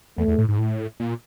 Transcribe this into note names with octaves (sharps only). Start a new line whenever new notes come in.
E2 A3
E2
A2
G#2
A2
A#2